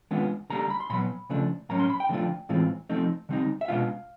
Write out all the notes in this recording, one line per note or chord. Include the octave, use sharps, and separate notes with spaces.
D#3 G#3 B3 D4 F4
D3 G3 A#3 A#5
A#5
B5
C6
A#2 F#3 B3 B5
C#3 F3 A3 D4
A2 F#3 A#3 C#4 A#5
C6
B5
G5
D3 F3 A3 D4 F4
A2 E3 G#3 C4 F4
F3 A3 C4 D#4
D3 G3 C4 D#4
E5
B2 G#3 B3 D4 F4 F5